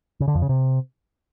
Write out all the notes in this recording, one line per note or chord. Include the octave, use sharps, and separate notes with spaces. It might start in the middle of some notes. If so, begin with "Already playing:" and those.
C#3
D3
F2
C#3
C3